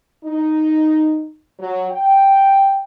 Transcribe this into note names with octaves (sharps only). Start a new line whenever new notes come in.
D#4
F#3
G5